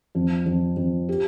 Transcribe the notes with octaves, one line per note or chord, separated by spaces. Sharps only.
F2
F2
F2
G4